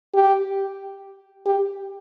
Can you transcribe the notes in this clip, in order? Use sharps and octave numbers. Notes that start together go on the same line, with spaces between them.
G4
G4